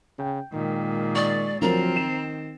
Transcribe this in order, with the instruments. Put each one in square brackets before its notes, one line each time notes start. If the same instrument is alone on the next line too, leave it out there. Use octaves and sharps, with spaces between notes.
[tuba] C#3 [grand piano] G5
[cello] A#2 G#3 [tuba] D#3
[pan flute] D5 [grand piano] C#6 D#6 A6
[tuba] D2 [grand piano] F3 F#3 A#4 [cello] C4 [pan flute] A#5
[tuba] D#3 [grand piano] E7